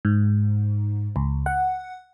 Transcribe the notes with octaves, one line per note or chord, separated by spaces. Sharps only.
G#2
C#2
F#5